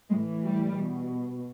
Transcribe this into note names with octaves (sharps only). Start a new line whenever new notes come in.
A2 E3 G#3
G3
B2